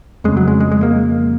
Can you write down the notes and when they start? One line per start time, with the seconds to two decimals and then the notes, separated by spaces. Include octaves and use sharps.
0.24 F2 C#3 G#3
0.37 F#3
0.48 G#3
0.60 G#3
0.72 G#3
0.83 A#3